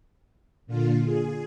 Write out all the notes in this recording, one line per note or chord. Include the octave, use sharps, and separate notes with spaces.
A#2 D3 F4
G#4